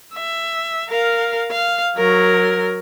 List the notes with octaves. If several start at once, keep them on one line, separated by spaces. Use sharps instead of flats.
E5
A#4 F5
F5
F#3 A#4